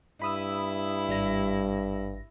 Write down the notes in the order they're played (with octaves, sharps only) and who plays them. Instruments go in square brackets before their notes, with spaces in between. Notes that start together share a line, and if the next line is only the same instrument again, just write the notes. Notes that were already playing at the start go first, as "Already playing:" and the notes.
[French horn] G2 [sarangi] E4 [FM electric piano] B5 D#6 E6
[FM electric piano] G#1 G3 A#6